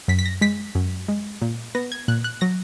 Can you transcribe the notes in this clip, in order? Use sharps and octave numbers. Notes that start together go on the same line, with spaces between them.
F#2 B6
B6
A#6
G#3 B6
F#2
G#3
A#2
B3 A#6
G#6
A#2 F#6
F#6
F#3 A#6